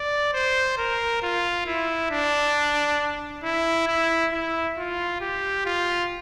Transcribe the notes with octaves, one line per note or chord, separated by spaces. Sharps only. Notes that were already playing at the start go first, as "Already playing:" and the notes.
Already playing: D5
C5
A#4
F4
E4
D4
E4
E4
E4
F4
G4
F4